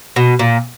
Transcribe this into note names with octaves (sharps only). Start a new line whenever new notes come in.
B2
A#2